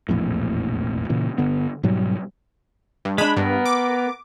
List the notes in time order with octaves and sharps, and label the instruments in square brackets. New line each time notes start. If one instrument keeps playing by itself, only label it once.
[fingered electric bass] E1 A#1 F2 A2
A#2 C#3 E3
G1 D3 B3
G#2 B2 F#3 G3
[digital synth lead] G2
[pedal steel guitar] G#3 D4 [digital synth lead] B5
[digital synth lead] G2 [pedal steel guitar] B3 A#4
[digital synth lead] D6